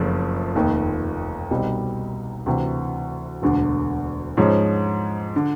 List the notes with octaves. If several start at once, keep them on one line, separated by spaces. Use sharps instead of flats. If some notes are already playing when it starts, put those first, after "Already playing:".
Already playing: F#1 F2 C#3 F3 A3
F1 D#2 D#3
C2 B2 G3 C4 D#4
D2 C3 E3
E1 D2 D3
G#2 F3 G#3 C#4
D3